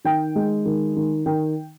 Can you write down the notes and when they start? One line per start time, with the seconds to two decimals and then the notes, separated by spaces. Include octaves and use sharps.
0.04 D#3 G5
0.36 G#3
0.65 D#3
0.96 D#3
1.26 D#3 G5